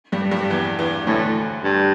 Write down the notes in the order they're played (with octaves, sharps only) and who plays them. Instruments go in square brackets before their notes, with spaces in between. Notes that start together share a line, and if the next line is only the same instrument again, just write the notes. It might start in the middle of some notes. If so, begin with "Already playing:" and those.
[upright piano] G2 G3
G2 G3
E2 E3
E2 E3
[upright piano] D2 D3 [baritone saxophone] A2
[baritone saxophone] G2